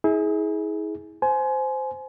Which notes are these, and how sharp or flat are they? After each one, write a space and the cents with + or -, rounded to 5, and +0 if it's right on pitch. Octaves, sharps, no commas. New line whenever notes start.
E4 -40 G#4 +10
C5 -10 G#5 +25